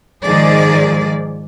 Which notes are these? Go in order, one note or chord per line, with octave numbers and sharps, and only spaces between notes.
G#2 D#3 F3 G#4 D5